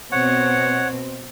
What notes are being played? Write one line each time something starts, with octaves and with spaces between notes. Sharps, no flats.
B2 C4 C#5 F#5